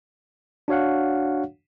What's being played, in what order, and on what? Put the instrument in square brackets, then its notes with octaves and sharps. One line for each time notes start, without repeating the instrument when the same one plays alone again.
[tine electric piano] D4 F#4 C#5 F5 F#5